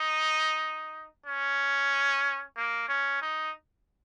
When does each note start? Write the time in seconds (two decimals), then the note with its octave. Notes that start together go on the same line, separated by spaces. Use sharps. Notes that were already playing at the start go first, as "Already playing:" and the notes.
Already playing: D#4
1.26 C#4
2.57 A#3
2.89 C#4
3.22 D#4